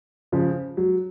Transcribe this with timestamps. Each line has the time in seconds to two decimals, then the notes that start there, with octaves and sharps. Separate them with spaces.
0.32 C#3 F3
0.77 F#3